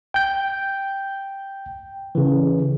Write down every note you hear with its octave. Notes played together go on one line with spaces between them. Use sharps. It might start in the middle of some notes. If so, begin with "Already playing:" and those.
G5 G6
C#3 E3